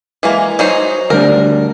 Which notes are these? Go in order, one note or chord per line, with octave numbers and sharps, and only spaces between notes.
E3 G#3 A#3
F#3 D#4 C5
D2 G3 D4 A#4